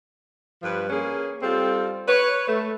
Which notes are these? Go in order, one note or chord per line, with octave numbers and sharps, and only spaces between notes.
G2 F3 B4
A#3 C#4 G#4
G3 C4 F4 A4
B4 C#5
A3